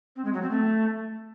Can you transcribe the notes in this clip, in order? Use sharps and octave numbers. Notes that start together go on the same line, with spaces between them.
C4
G#3
F#3
C4
A3